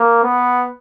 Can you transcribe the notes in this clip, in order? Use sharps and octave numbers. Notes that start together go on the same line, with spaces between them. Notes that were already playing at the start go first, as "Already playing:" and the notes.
Already playing: A#3
B3